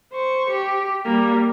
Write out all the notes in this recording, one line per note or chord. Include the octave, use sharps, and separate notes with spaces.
C5 C#6
G4
G3 A#3